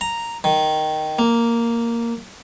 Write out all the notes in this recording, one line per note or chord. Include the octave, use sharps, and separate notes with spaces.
A#5
D#3
A#3